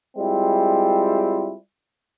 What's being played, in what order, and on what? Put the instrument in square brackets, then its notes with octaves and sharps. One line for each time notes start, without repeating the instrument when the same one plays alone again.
[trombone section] G3 G#3 C4 E4 F4